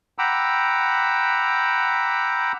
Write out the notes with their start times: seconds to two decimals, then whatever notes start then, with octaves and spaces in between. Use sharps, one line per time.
0.19 F#5 G5 A#5 B5 D6 E6